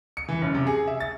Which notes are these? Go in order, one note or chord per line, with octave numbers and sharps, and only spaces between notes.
C#7
E3
F#1
C3
G#4
E5
A6